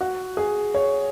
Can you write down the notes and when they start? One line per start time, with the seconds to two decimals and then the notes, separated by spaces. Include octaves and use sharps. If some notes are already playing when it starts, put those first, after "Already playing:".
0.01 F#4
0.37 G#4
0.74 C#5